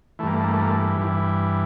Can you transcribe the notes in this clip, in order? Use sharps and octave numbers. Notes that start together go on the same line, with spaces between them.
G2 E3 A3 A#3
A3
A#3
A3
A#3
A3
G2 E3